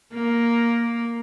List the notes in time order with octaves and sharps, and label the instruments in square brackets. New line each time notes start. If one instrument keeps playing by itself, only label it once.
[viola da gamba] A#3